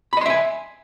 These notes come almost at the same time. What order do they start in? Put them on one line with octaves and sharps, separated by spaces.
B5 D#5 C6 E5 G#5